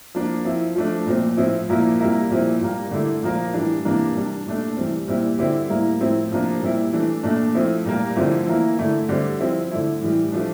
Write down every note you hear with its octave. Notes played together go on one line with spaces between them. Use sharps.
F3 A#3 D4
F3 C4 E4
F3 A3 D4
A#2 F3 C4
A2 F3 C4 E4
A#2 F3 A#3 E4
C3 G3 A#3 E4
A#2 F3 C4 E4
A#2 G3 A#3
D3 A3 E4
A#2 F3 A#3
A2 E3 G3 D4
C3 E3 A#3 D4
C3 G3 D4
A#2 A3 D4
C3 E3 G3 C4
A#2 G3 C4 E4
D3 G3 C4 E4
A2 G3 A#3 E4
A2 F3 C4 E4
C3 F3 A#3 D4
A#2 G3 C4 E4
E3 A3 D4
A#2 A3 D4
F3 A3 C4 E4
A#2 G3 A#3
D3 F3 A3 C4 E4
E3 A#3 E4
D3 A3 E4
D3 G3 C4
F3 C4 E4
D3 A3 E4
A2 E3 G3
F3 A3 D4